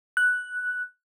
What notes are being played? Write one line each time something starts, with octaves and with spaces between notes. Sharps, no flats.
F#6